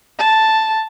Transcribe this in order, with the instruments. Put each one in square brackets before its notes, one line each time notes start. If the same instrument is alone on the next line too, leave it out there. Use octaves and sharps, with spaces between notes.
[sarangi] A5